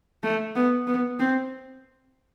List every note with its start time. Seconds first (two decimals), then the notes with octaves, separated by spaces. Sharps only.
0.23 A3
0.55 B3
0.87 B3
1.19 C4